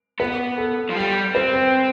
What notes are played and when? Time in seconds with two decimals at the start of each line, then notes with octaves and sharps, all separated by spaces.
0.20 B3 B4
0.58 A4
0.90 F3
0.96 G3
1.35 C4 B4
1.54 C5